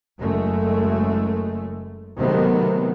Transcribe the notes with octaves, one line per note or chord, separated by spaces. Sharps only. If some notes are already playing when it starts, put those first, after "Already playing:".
F#1 F#2 G#3 A3
C3 D#3 F#3 G#3 A3 B3